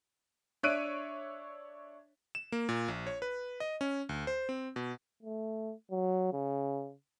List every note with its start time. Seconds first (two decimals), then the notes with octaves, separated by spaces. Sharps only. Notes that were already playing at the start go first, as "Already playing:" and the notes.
0.63 D4 C#5 E5 F#6 D7 D#7
2.35 E7
2.52 A#3
2.69 A#2
2.88 A#1
3.07 C#5
3.22 B4
3.60 D#5
3.81 C#4
4.09 D2
4.27 C5
4.49 C4
4.76 B2
5.22 A3
5.91 F#3
6.33 C#3